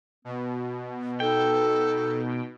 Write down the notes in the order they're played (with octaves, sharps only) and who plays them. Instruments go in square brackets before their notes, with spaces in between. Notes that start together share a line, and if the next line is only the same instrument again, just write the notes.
[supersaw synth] B2 [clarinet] B3
[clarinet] D#4 [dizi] A4 [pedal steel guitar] G5